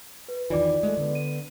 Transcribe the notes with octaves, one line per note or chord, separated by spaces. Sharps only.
B4
E2 D#3 E3 F4 D5 D6
G#3 A3
D3 B3
D#7